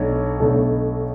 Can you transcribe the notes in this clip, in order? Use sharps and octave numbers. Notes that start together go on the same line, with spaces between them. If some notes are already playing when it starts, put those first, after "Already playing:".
Already playing: B1 B2 A3 D4 C#5
B1 B2 A3 D4 A4